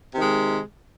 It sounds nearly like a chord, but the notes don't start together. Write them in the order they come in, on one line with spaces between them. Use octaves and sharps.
C3 D#3 G#3